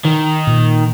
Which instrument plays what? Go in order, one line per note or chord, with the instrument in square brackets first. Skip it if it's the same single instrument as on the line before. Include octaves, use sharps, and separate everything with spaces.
[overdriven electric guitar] D#3
[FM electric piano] A#2